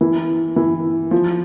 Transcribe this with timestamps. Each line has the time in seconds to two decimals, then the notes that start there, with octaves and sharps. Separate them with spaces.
0.01 E3
0.56 E3
1.11 F3